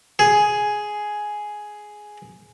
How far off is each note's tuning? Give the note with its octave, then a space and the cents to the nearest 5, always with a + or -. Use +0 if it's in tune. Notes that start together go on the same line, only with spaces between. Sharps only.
G#4 +5